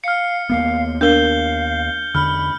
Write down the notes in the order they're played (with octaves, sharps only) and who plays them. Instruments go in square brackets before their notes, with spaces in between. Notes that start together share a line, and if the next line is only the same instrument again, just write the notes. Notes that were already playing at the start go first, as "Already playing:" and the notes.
[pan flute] F5 [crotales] F6 C#7
[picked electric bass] D#2 A#3 B3 [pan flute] F5
[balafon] D4 A#4 [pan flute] F5 [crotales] G6 G7
[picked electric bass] E2 D3 [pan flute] B5 [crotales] F6